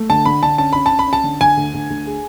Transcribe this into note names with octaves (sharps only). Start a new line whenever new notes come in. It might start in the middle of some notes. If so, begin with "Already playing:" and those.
Already playing: A3
D3 A5
D3 B5
D3 A5
C#4 A5
C#4 B5
A5
C#4
B5
C#4
A5
D3
D3 G#5
D2
D2
D2
G#4